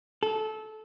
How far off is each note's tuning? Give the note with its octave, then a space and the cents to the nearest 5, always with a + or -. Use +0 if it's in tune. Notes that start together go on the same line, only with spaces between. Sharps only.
A4 -20